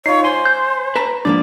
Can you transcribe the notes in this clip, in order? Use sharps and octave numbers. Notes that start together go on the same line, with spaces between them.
D#4 F4 C#5 C7
C5 G#5 C6
G6
B4 A5 A#5
G#2 F3 A#3 D4 D5